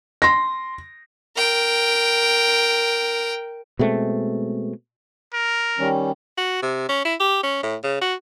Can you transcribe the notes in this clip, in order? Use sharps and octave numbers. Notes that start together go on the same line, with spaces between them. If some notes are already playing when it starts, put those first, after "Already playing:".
C6 A#6
A#4 G5
B2 G#3 A3 C4
A#4
D#3 G3 C#4
F#4
C3
C#4
E4
G4
C#4
A2
C#3
F#4